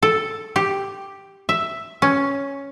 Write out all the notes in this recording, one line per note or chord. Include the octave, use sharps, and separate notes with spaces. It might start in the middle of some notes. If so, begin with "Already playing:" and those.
A4
G4
E5
C#4